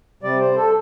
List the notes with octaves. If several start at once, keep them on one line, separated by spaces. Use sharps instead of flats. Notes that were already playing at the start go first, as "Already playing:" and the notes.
C3 G3 D5
C5
A4